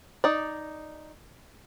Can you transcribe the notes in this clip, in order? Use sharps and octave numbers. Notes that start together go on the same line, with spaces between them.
D#4 D5